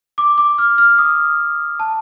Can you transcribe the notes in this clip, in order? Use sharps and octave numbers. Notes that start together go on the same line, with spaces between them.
D6
D6
F6
F6
D#6
A5